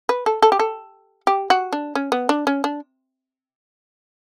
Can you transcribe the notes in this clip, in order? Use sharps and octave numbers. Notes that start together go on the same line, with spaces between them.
B4
A4
A4
G4
A4
G4
F#4
D4
C#4
B3
D4
C#4
D4